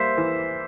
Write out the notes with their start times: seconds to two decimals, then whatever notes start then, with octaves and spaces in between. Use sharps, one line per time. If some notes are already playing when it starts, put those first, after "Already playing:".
Already playing: G3 A#3 C5 E5
0.18 E3